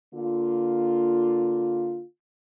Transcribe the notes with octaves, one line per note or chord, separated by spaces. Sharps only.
D3 A#3 F4